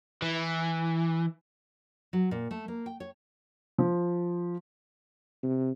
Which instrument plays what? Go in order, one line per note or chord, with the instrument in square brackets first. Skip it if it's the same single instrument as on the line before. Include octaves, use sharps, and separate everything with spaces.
[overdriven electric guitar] E3
[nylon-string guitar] F#3
A#2
A3
A#3
G5
C#5
[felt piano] F3
[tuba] C3